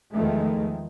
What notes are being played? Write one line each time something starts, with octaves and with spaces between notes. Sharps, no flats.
E2 D#3 F3 G#3 A3